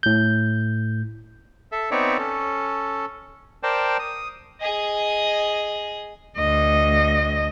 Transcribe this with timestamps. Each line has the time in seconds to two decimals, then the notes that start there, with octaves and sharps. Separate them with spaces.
0.03 A2 G6
1.72 A4 E5
1.91 B3 C4 D#4 C#5 D5 E5
2.18 C#4 A4
3.63 A#4 C5 D5 G5 A5
3.99 D#6
4.61 G#4 D#5
6.37 D2 D#5